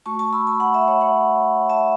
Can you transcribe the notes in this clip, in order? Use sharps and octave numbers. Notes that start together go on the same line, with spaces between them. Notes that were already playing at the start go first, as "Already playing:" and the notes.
A3 F#4 A5 C#6
A5 C#6
B5 E6
A5 C#6
F#5 B5
E5 A5
C#5 F#5
C#5 F#5
E5 A5